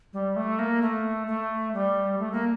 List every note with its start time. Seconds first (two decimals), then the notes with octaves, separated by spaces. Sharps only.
0.13 G3
0.36 A3
0.59 A#3
0.82 A3
1.28 A3
1.74 G3
2.19 A3
2.32 A#3